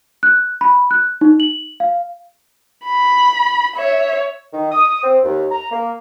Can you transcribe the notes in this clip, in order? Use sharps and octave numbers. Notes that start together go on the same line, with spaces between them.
F#6
B5
F#6
D#4
F#7
F5
B5
C#5 E5
D#3
D#6
C4
D#2
A#5
A#3